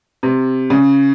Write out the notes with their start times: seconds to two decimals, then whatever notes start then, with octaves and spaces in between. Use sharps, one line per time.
0.23 C3
0.70 C#3